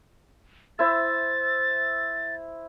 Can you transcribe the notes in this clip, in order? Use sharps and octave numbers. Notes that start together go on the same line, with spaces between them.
E4 C5 E5 A6